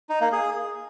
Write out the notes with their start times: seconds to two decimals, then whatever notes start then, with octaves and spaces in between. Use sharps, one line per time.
0.09 D#4
0.21 A#3
0.32 G#4